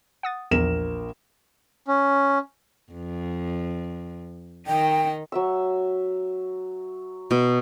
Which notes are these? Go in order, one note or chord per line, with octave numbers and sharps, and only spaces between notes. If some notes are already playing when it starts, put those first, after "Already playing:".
F#5 D#6 A6
A#1 E2 A#4 E7
C#4
F2
D#3 D#4 G5
F#3 E5 E6
B2